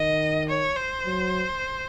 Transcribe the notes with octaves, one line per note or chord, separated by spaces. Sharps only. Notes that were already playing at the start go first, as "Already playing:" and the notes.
Already playing: D#3 D#5
C#5
C5
F#3